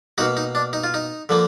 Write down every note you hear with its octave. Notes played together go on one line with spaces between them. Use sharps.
B2 A#3 D#4 F#4
D#4
D4
D#4
F4
D#4
D3 F3 A#3